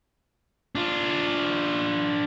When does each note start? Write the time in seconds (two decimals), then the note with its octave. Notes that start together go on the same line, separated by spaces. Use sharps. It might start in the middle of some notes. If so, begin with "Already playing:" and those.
0.75 D4 F4